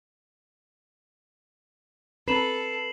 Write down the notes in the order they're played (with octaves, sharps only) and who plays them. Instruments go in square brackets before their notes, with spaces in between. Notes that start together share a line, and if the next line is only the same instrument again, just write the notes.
[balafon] C4 [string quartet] A4 [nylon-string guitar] B4 [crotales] C7 E7 F#7